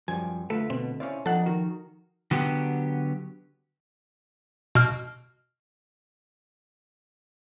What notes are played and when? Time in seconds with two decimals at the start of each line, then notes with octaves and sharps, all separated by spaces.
0.08 F#2 F3 G3 G#5
0.50 D2 A3 F4 A4 B4 E5
0.70 B2 C4
1.00 C#4 E4 C5 D5 F5
1.26 F3 C4 D4 D#4 A4 F#5
1.46 D#3 F#4 A#4
2.31 D3 F#3 B3 G4
4.75 B2 F6